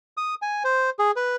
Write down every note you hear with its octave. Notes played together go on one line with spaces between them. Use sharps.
D#6
G#5
C5
G#4
B4